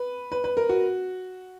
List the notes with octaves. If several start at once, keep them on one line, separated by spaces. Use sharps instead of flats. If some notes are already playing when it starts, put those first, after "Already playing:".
Already playing: B4
B4
B4
A#4
F#4